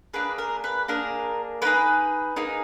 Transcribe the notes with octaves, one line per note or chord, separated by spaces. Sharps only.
A#3 D4 G#4 B4
A#4
B4
A#3 D4 G#4 A#4
A#3 D#4 G#4 B4
A#3 D#4 G#4